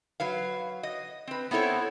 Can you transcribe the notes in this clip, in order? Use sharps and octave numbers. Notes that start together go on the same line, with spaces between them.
F#3 B4 F5
D#5
C4 B4
B3 C4 E4 A4 C#5